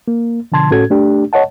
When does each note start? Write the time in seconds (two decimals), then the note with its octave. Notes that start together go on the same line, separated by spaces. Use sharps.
0.08 A#3
0.52 B2 D3 F3 A5 C6 G#6
0.71 A2 C#4 F#4 A4 G#6
0.90 A3 D4 G4
1.33 C#5 D#5 F#5 A5